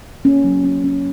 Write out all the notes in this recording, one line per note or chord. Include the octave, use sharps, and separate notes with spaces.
A#3 C#4
F#3
C#4
C#4